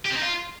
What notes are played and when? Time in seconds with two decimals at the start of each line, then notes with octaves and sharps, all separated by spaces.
0.05 G4
0.11 C4
0.16 D#4
0.22 F4